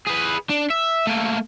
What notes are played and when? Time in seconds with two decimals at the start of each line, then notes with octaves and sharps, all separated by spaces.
0.07 G#4 B4
0.49 D4
0.70 E5
1.07 A3 A#3